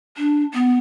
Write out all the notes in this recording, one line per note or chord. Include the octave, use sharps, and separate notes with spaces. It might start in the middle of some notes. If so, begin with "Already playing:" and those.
D4
B3